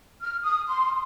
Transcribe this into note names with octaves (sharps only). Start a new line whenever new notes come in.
F6
D#6
C6